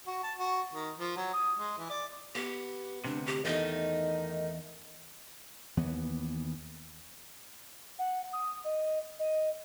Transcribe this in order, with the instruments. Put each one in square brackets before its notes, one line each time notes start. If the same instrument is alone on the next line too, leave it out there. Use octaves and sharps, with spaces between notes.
[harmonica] F#4
A5
F#4
D#3
F3
F#3
D#6
G#3
E3
D5
[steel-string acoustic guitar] B3 [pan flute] G4
[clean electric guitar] D2 G2 C3 [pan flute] D4
[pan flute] G4
[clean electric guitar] E2 [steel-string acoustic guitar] D#3 A3 D#4 [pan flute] D#5
[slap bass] D#2 E3 B3
[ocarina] F#5
D#6
D#5
D#5